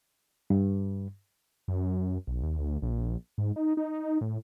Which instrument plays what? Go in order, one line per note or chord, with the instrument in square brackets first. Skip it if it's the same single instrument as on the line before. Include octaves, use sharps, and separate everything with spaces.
[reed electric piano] G2
[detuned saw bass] F#2
B1
D#2
D2
A#1
G#2
D#4
D#4
A2